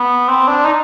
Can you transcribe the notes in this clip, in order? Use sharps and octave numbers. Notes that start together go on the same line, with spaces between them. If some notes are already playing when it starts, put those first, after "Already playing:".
Already playing: B3
C4
D4
D#4